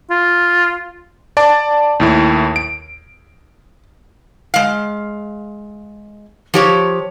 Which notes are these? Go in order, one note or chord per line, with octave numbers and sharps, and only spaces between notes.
F4
D5 A5 D6
D#2 A2 E4
D7
G#3 F5
F3 G4 C#5